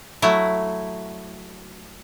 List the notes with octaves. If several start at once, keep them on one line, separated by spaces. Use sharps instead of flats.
F#3 A3 E4